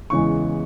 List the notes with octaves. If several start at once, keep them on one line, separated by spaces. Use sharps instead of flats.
E2 C#3 E3 G#3 C#6